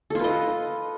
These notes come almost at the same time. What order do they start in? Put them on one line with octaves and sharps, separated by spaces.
A4 F4 B4 D#5